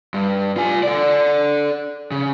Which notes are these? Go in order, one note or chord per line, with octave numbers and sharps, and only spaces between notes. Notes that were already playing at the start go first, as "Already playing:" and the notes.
G2
F4 G#5
A4 D5
C#3